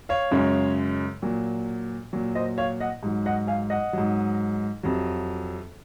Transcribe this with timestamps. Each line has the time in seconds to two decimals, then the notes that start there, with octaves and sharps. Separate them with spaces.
0.09 C#5 F5
0.31 F#2 C#3 G#3
1.22 A#2 F#3
2.13 A#2 F#3
2.35 C5 D#5
2.58 C#5 F5
2.80 D#5 F#5
3.03 G#2 F#3
3.26 D#5 F#5
3.47 F5 G#5
3.70 D#5 F#5
3.93 G#2 F#3
4.83 F2 C3 F#3